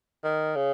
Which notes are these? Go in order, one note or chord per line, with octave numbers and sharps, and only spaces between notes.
D#3
C#3